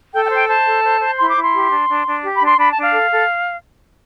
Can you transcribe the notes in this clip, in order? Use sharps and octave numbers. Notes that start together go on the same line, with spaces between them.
A4 G5
G5
C5
G5
C5 A5
A4
C5
C5
E4 C6
D6
E4
C6
G4
D4
D4
D4
G4
B5
D4
C6
D4 B5
A5
D4
F5
A4
A4